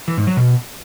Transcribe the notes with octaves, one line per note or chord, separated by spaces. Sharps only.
E3
G#2
F#3
B2